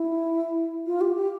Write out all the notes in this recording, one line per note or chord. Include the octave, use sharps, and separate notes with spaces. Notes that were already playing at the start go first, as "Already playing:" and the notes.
Already playing: E4
F4
G4
G4